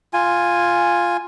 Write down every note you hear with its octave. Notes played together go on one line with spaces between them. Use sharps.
F4 G#5